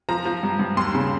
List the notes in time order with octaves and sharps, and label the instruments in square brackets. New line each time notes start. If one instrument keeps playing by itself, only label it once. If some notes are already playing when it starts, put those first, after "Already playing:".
[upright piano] F3 A#5
F3
G2
G2
D#2 C6
C#3